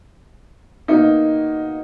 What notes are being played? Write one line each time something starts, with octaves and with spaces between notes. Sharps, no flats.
B2 A#3 D#4